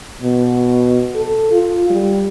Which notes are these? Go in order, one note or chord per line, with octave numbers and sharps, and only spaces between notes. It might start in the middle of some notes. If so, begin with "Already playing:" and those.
B2
A4
F4
G3